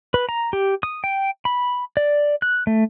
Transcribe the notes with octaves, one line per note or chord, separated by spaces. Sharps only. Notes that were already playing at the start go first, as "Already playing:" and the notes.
B4
A#5
G4
D#6
G5
B5
D5
F#6
A3